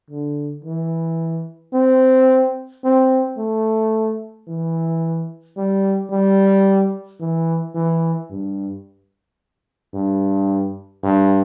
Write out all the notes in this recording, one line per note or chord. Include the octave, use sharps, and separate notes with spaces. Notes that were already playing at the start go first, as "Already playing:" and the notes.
D3
E3
C4
C4
A3
E3
G3
G3
E3
E3
G2
G2
G2